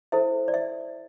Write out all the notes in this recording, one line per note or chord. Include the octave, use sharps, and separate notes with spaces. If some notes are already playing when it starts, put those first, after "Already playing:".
E4 A4 C5 E5
D5
E5